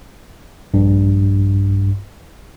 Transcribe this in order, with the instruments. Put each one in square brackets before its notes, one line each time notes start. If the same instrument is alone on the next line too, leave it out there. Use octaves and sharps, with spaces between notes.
[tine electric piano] A#1 G2